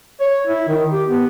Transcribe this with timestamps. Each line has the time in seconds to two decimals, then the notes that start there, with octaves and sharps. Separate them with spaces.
0.20 C#5
0.47 E4
0.68 D#3
0.92 G4
1.08 B3